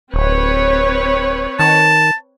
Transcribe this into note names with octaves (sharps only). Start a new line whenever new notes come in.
D1 C4 B4 C#5
D#3 A5